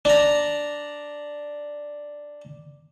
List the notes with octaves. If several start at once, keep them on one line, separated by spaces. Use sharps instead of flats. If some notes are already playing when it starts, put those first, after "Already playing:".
D4 A#5